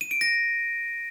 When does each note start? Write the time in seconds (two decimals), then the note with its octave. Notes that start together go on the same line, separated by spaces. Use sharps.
0.01 D#7
0.11 D7
0.21 A#6